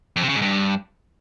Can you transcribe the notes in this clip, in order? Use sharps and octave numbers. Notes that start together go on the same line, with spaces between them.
F2
C3
C#3
G#2
G2